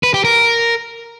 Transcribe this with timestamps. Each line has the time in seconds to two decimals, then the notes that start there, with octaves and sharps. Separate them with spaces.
0.03 B4
0.14 G4
0.25 A#4